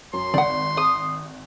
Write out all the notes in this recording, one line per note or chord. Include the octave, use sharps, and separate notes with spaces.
F#2 C6
G#1 D5 F#5
D#6